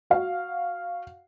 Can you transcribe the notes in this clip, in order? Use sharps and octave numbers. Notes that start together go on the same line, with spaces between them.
F#4 F5 F#5